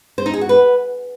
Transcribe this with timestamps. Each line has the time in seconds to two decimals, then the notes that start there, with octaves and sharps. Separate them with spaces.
0.18 C5
0.26 D#4
0.34 G#4
0.41 F#4
0.49 B4